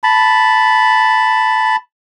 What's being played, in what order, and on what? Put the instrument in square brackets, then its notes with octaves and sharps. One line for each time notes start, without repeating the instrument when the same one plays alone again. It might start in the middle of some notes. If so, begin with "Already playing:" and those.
[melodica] A5 B5